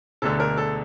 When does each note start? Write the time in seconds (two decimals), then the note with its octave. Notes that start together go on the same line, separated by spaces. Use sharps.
0.22 E1 D2 D3 A4
0.40 A#4
0.57 A4